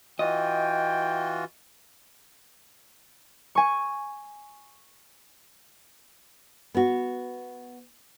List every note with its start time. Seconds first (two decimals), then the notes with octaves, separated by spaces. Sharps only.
0.19 E3 F4 F#4 D#5 G5
3.55 G#5 C#6
6.75 B3 F#4